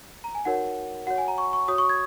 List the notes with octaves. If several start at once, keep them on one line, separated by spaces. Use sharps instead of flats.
A#5
G#5
D#4 F#4 A#4 C#5 F#5
F#4 C#5 F#5
G#5
A#5
C#6
C#6
F#4 C#5 D#6
C#6
G#6